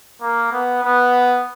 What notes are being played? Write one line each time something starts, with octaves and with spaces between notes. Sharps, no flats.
A#3
B3
B3